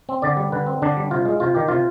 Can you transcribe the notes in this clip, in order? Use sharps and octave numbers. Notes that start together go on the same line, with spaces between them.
C4
D3 D5
G3
D3 B4
C4
D3 D4
G3
C3 F4
G#3
C3 F4
D#3 G4
C3 F4